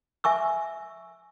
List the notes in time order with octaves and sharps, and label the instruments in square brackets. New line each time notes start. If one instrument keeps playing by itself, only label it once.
[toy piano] E5 G#5 C#6 E6